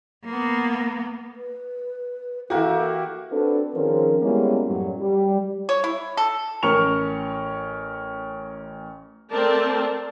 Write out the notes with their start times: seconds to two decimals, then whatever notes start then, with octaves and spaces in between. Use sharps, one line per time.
0.25 A#3 B3
1.36 B4
2.50 E3 A#3 E4 F#4 G4 A4
3.32 C4 D4 F#4 A4 B4
3.74 D#3 F3 C4 C#4 G#4 A#4
4.22 G3 G#3 A#3 B3 C#4 E4
4.68 F#2 A2 F#3 G3
5.01 G3
5.69 C#5
5.84 E4
6.17 A4
6.63 A1 C#4 A#4 C#6 F7
9.30 A3 C4 A#4 D5 A5